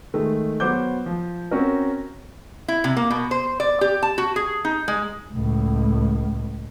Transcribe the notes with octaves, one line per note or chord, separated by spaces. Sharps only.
D#3 G#3 A3
F#3 B3 C5 F#5 D6 G6
F3
C4 C#4 F#4 A#4
E4
C3
A#3
B2
C5
D5
G4
A5
F#4
G#4
D#4
G#3
C#2 A2